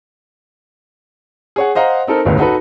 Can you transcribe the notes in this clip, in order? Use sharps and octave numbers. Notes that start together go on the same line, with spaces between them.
G#4 C#5 F#5
C5 D#5 F5 F#5 A#5
C4 D#4 A4 A#4
G1 C#2 A2
D#4 F#4 A4 B4